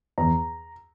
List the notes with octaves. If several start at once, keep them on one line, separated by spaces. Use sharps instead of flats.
E2 A#5